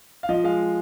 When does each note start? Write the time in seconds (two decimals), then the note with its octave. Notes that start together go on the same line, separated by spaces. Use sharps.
0.23 F5
0.29 F3 D#5
0.44 G#3 F5